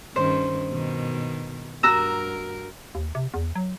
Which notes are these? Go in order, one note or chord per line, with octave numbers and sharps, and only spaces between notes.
G2 D#3 C#4 C5
B2 D#3
G2 F#4 A#4 A#5 E6
D#2
C3
E2
F#3